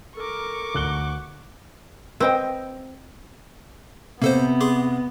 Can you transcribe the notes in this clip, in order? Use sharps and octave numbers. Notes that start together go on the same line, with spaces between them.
A4 A#4 C#6 D6
D2 F#6 G7
C4 B4 D#5 G5
C3 A#3 B3 A4 C5
G#4 C6 D6